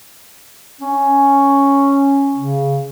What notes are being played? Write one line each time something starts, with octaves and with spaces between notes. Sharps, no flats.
C#4
C#3